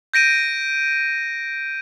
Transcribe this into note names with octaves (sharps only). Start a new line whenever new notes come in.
G6 A#6 D7 D#7